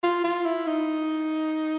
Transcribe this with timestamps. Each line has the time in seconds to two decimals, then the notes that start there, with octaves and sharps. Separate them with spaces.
0.03 F4
0.24 F4
0.45 E4
0.67 D#4